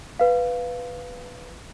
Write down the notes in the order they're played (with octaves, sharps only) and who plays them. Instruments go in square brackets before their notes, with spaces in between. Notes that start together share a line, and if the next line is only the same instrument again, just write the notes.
[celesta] B4 F5